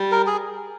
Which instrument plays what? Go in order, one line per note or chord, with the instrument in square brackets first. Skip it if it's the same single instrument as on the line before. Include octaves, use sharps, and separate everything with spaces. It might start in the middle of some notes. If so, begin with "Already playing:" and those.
Already playing: [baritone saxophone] G3
[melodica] A#4
G#4